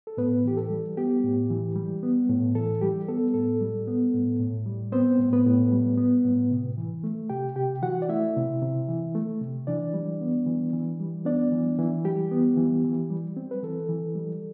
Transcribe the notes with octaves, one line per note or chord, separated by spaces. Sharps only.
A4
A2 B3 B4
E3 G4
A4
G3
B3 G4
A2
E3
G3
B3
A2
E3 A4
G3 G4
B3 A4
A2 A4
G3
B3
A2
A2
G3
B3 C4 C5
A2
B3 B4
A2
G3
B3
A2
C3
E3
A3
C3 G4 G5
C3 G4 G5
E3 F#4 F#5
D5
A3 E4 E5
C3
C3
E3
A3
C3
E3 D4 D5
G3
B3
E3
E3
G3
B3 D4 D5
E3
E3
G3 G4
B3
E3
E3
G3
C4
B4
E3 A4
E3
G3